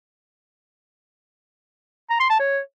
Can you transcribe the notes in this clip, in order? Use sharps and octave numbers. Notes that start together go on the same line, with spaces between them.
A#5
C6
A5
C#5